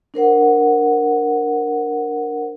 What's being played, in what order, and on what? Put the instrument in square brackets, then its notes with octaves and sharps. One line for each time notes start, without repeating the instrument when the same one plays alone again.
[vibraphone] D4 A#4 C5 F#5